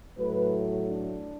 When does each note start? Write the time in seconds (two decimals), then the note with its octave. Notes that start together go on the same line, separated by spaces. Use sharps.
0.18 A2 F#3 A3 B4
0.87 D4